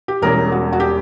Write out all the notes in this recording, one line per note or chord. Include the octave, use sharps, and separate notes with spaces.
G4
E1 E2 B2 G3 C#4 A#4
F#4
F#4
G4